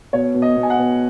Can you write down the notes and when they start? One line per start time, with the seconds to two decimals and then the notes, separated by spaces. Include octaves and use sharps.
0.13 B2 C#5
0.34 B2
0.42 D#5
0.56 B2
0.63 G#5
0.70 F#5
0.78 B2